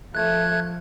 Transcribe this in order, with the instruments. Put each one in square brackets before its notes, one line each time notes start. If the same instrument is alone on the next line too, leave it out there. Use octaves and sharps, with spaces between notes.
[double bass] F3 [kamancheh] A3 [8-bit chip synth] F#6 G#6